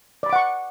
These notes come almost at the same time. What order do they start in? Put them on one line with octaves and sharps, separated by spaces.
D5 B5 D6 F#5 C#6